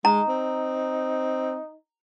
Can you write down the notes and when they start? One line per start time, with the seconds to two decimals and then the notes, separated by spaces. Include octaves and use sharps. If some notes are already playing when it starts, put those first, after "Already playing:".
0.05 G#3 D#4 A#5
0.29 C4